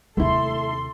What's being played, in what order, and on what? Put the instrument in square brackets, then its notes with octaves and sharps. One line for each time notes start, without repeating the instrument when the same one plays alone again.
[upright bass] D#2 C3 [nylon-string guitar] A3 E4 [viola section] A4 C6